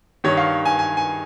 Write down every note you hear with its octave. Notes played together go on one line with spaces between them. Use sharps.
G2 D#3 C#5
F5
G#5
G#5
G#5